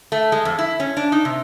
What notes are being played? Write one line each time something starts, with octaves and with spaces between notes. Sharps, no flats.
A3
G#3
F2
E4
C#4
D4
D#4
C3